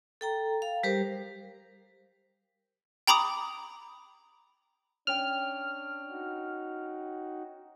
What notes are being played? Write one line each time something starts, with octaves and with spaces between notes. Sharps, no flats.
A4 G5 A#5
F5
G3 G4 A#4 C5
G5 A#5 B5 D6 D#6
C#4 D4 C#5 G5 F6
D#4 F#4